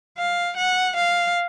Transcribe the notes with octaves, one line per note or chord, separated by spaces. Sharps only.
F5
F#5
F5